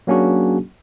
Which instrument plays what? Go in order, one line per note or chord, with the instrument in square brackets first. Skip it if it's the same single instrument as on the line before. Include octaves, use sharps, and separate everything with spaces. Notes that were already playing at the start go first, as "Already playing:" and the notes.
[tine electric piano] F#3 A#3 C#4 D4 F#4 G#4